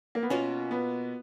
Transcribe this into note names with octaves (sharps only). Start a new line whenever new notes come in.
A#3
B3
B2 A#3 C#4 F4 A#4
B3